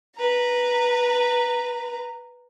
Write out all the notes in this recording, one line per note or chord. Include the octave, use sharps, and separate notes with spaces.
B4 A#5